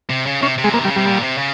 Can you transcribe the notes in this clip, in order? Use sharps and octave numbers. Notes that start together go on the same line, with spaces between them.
C3
C#3
C3 C#4
C3
G#3
F3 A#3
D#3
G3
C#3
C3 G3
A#2
C3
C#3